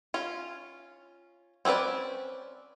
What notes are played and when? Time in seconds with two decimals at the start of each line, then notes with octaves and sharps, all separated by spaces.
0.14 C#4 F4
1.65 C4 C#4 G#4 B4 D5